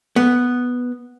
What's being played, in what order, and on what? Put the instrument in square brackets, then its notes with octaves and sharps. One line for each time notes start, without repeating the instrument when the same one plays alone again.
[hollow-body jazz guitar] B3